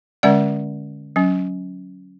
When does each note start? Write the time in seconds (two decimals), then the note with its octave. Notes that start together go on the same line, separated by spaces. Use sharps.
0.23 D3 G#3 C#4 D5 F#5
1.16 F#3 C#4